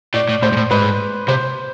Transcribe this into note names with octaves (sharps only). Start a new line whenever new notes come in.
A2 D5
A2
A2 C5
G#2
A2
G#2 B4
C3 C5